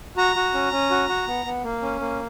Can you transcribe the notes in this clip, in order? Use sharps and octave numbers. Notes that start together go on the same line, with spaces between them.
F#4 A#5
F#4
C#4
C#4
F#4
F#4
B3
B3
A#3
C#4
A#3